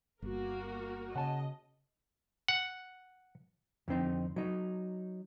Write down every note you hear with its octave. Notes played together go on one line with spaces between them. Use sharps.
G1 A#3 F#4 A#4
C#3 D#5 F#5 A5
F#5
F2 D3 C4 D#4
F#3 D#4